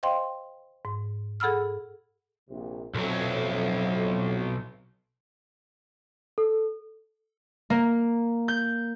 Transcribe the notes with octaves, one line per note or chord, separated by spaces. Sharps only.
C5 D#5 F5 G5 C6
G#2
G#4 A4 F#5 B5 E6 F6
A#1 C3
B1 F2 A2 F#3
A4
A#3
G6